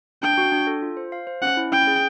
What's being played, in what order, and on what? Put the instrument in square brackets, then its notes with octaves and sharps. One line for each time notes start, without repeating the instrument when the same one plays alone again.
[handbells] D4 [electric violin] G5
[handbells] F#4
D4
A4
F4
C5
F5
C5
[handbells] C#4 [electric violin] F#5
[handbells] E4
[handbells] C#4 [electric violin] G5
[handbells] G#4